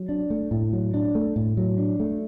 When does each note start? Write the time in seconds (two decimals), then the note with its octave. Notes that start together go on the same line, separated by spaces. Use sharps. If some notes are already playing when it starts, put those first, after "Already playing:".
Already playing: F#3
0.09 D4
0.30 A3
0.51 A2
0.73 F#3
0.94 D4
1.15 A3
1.36 A2
1.57 F#3
1.78 D4
2.00 A3